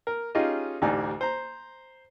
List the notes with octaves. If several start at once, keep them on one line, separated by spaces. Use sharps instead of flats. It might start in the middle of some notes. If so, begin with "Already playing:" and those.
A#4
C#4 D#4 F4 G4 G#4 D#5
A1 D2 D#4 G4 D5 G#5
C5 A#5